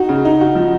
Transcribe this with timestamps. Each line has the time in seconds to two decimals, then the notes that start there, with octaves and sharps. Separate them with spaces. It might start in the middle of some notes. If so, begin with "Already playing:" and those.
Already playing: D#4 F#4
0.09 C#3
0.25 D#4
0.41 F#4
0.55 F3